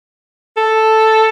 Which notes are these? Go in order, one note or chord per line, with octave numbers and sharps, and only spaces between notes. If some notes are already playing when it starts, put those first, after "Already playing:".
A4